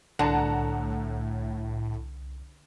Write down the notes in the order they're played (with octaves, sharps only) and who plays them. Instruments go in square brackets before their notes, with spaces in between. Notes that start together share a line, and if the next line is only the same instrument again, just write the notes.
[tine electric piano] C2 [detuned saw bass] A2 [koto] D3 [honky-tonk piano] F#5 A5 A#5